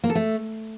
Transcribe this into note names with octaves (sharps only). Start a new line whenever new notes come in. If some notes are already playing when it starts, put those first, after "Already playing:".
A#3
A4
A3